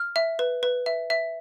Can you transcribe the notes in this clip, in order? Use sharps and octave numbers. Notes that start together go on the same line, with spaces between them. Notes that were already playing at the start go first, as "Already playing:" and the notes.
Already playing: F6
E5
B4
B4
E5
E5